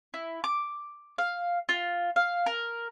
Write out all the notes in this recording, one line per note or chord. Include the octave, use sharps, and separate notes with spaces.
E4
D6
F5
F4
F5
A#4